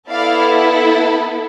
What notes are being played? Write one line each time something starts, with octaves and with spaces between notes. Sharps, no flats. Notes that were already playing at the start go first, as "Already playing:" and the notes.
B3 E4 A4 D5 F5